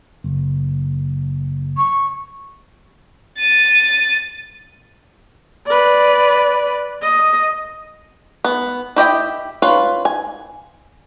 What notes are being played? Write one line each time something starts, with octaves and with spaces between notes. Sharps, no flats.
F#1
C#6
A6 D#7
B4 D5
D#5
B3
E4 G4 D#5 G5
C#4 F4 B4 F5
G#5